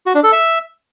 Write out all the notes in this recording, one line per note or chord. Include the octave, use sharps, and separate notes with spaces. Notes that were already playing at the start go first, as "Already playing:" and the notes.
F#4
D4
A4
E5